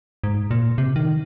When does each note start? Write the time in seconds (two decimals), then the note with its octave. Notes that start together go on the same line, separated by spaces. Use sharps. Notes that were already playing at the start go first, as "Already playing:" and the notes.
0.24 G#2
0.51 A#2
0.78 C3
0.96 D#3